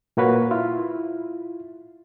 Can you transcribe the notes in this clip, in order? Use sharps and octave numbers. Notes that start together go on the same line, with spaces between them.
A#2 A#3 F#4 B4 C#5
E4 F4